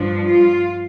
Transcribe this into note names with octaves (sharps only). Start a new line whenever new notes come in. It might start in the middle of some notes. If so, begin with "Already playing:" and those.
Already playing: G2 F3 D4
F4